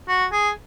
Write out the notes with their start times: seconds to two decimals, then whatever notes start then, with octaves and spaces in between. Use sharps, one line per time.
0.08 F#4
0.32 G#4